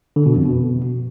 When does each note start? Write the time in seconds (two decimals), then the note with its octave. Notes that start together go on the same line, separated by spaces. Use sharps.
0.16 D3
0.26 B2
0.36 F2
0.46 B2